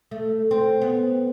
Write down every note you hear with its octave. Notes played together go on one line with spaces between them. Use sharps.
A3
C4
B3